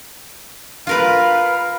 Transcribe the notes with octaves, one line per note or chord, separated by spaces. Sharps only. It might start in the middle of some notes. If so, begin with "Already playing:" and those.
F4 A#4 B4 F5